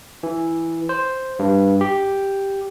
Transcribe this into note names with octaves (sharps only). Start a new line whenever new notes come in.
E3
C5
G2
G4